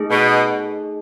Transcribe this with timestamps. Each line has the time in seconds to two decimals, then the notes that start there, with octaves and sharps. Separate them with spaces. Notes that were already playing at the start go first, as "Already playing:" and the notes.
Already playing: A3 D#4 G#4
0.10 B2